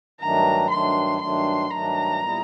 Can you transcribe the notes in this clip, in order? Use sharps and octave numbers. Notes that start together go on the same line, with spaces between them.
G2 D#3 F#3 A3 D4 A#5
G2 D#3 F#3 A3 D4 C6
G2 D#3 F#3 A3 D4 C6
G2 D#3 F#3 A3 D4 A#5
A#2 G3 B3 E4